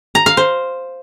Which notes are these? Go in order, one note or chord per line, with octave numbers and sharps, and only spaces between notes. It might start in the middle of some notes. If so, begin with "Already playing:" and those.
A#5
F5
C5